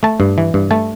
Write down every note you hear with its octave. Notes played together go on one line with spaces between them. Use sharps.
A3 A5
G2
E3
G2
A3 A5